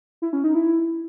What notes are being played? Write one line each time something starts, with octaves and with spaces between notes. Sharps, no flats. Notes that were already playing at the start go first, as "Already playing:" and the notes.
E4
C#4
D#4
E4